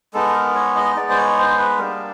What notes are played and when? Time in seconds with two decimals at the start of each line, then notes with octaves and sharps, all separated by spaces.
0.14 G#3 B3 D#4 A4
0.35 A#4
0.55 C#5
0.76 D#5
0.96 G#3 B3 D#4 D5
1.10 C5
1.17 C#5
1.38 C5
1.58 B4
1.79 G3 A#3 D4 A#4